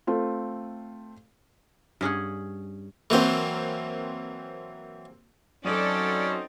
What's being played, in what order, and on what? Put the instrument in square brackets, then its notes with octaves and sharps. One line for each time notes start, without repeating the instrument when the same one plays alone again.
[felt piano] A3 C4 F4
[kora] G2 C#4 G#4 F#5
[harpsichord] E3 F#3 C5 [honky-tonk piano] A#3 C4
[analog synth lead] F#3 [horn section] C4 D#4 C5 [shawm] C#4 [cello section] A4 D5